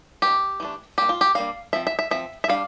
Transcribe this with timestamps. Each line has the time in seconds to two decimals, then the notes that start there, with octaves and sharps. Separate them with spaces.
0.22 E3 A3 D4 G4
0.60 E3 A3 D4
0.98 G3 A#3 D4 G4
1.09 F4
1.21 G4
1.35 G3 A#3 D4 F5
1.73 F3 C4 E5
1.87 E5
1.99 E5
2.11 F3 C4 E5
2.44 E5
2.48 G3 D4 F5